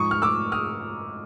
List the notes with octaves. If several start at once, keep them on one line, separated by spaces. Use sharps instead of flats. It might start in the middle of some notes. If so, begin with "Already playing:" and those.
Already playing: G#2 F3 G#3 C#6 D#6
F6
D6 E6
D#6 F6